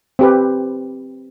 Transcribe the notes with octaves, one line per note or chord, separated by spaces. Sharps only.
C4 G4 B4